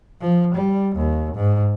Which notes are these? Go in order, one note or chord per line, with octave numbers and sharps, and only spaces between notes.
F3
G3
D#2
G#2